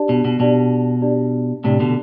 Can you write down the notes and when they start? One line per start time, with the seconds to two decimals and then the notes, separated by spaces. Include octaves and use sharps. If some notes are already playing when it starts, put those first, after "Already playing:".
Already playing: D4 G4 D5 A5
0.09 B2
0.25 B2
0.40 B2 D4 G4 D5 A5
1.02 D4 G4 D5 A5
1.64 A2 C3 D4 G4 D5 A5
1.80 B2 D3